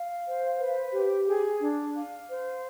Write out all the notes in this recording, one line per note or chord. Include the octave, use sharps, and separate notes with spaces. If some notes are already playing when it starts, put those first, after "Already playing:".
Already playing: F5
C5
B4
G4
G#4
D4
F5
C5